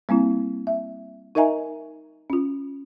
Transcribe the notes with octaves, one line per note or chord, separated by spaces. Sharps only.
G3 A#3 C4 E4
E5
D#4 A#4 D#5 E5 G#5 A#5
C#4 F4